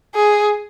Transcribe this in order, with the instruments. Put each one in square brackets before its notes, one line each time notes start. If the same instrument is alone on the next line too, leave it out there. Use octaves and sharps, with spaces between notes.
[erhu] G#4